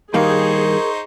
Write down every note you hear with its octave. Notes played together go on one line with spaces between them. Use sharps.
G2 D#3 A#3 D#4 G#4 A#4 C5 C#6